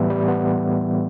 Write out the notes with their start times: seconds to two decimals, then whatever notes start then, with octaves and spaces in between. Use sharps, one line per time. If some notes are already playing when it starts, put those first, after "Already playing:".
Already playing: A2 E3 G3 B3 E5
0.10 G3
0.28 B3